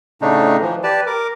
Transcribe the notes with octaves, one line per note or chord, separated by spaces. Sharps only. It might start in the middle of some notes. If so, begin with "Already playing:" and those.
A2 C#3 A3 D4 D#4
E3 F3
G4 B4 D5 A5
A#4 D6